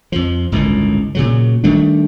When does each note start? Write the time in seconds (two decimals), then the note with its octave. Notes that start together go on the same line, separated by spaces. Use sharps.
0.12 F2 F3
0.52 G1 C#2 A2 D#3
1.15 A#2 C#3 F#3
1.64 D#3 G3 A3 D4